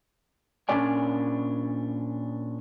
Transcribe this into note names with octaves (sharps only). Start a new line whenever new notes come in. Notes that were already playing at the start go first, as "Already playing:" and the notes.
A#2 C#4 D4 C#5 D5 G#5